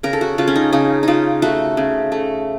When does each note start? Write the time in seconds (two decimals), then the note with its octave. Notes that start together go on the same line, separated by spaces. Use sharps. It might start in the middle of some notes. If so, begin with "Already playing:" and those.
0.03 C#3 A#4
0.13 A4
0.21 F#4
0.38 C#3 F4
0.48 C#4
0.55 D#4
0.72 C#3 D#4
1.03 C#3 D#4 F4
1.42 A3 F#4
1.77 C#3
2.12 A3